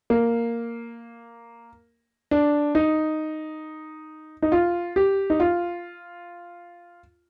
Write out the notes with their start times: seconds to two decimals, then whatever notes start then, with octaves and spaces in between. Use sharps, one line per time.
0.10 A#3
2.31 D4
2.75 D#4
4.42 D#4
4.52 F4
4.96 G4
5.30 D#4
5.40 F4